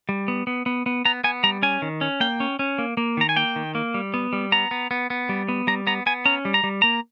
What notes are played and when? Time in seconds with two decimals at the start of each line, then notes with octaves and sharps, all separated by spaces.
0.09 G3
0.28 B3
0.47 B3
0.66 B3
0.86 B3
1.05 B3 A#5
1.24 B3 G#5
1.44 G3 A#5
1.62 C#4 G#5
1.82 D#3
2.01 C#4
2.20 A#3 G5
2.40 C#4
2.59 C#4
2.78 A#3
2.97 A#3
3.17 D#3 A#5
3.29 G#5
3.36 A#3 G5
3.56 D#3
3.75 A#3
3.94 G3
4.14 B3
4.33 G3
4.52 B3 A#5
4.71 B3
4.91 B3
5.10 B3
5.29 G3
5.48 B3
5.67 G3 A#5
5.87 B3 A#5
6.06 B3 G#5
6.25 C#4 A#5
6.45 G3
6.54 A#5
6.64 G3
6.82 A#3 A#5